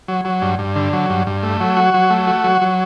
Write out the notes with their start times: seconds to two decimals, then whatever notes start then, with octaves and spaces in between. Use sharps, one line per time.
0.08 F#3
0.25 F#3
0.42 G2
0.59 G2
0.76 D3
0.93 F#3
1.10 G2
1.27 G2
1.43 A3
1.60 F#3
1.77 F#4
1.94 F#3
2.10 A3
2.27 F#4
2.44 F#3
2.61 F#3